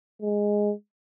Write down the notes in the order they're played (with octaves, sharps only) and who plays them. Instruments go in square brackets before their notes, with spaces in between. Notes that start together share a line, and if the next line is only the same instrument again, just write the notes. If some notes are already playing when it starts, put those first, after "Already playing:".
[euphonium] G#3